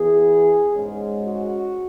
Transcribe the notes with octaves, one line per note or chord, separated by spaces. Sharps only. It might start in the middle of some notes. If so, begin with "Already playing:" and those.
Already playing: E2 E3 B3 G#4
G#2 G#3 C#4
F#4